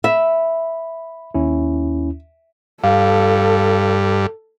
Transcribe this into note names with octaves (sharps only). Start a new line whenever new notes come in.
E5 B5
D#2 C#4 E4
G2 A4 F5